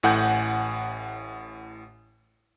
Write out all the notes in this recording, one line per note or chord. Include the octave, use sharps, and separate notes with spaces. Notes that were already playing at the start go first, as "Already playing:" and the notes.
A1 A2 F#5 G#5 G6